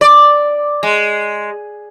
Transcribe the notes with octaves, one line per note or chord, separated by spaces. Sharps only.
D5
G#3